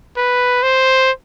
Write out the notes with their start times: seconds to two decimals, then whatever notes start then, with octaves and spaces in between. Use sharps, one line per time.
0.17 B4
0.63 C5